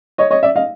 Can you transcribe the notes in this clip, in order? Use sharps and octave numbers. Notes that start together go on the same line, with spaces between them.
C#5 D#5
C#5 D#5
D5 E5
D#5 F5